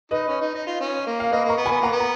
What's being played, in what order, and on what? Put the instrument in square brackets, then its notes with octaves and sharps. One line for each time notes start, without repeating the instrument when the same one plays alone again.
[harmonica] D#4 [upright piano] B4 D#5
[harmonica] C#4
D#4
D#4
F4
C#4
A#3
[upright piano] F5
[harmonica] A#3 [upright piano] B4 D#5
[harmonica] A#3 [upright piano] A#5 C#6
[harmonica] B3
[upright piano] G#5 B5
[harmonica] B3
[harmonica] A#3 [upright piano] F#5 A#5
[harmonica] B3
[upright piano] A#5